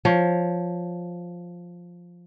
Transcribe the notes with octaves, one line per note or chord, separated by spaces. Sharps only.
F3 C#5